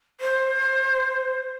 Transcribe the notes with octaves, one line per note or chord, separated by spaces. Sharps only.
C5